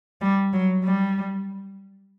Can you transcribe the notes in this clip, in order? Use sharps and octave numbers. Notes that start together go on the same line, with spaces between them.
G3
F#3
G3